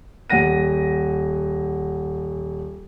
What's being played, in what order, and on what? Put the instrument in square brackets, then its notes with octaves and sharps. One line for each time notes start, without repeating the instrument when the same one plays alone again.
[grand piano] D#1 F#5 A#6 D#7